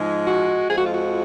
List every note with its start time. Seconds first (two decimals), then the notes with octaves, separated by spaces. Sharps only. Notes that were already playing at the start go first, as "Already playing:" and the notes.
Already playing: G#2 F3 G#3
0.24 F#4
0.68 F2 F3 G#3 G#4
0.76 F#4
0.83 F4
0.91 F#4